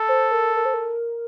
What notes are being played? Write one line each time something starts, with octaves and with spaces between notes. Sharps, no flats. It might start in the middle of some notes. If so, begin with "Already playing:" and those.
Already playing: A4
C5
A#4
A#4
C5
A#4